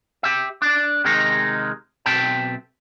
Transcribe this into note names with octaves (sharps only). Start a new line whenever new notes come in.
G4 E5
D4 D5
C3 D#3 G#3 D#4
B1 B2 C4 E5 G5 A5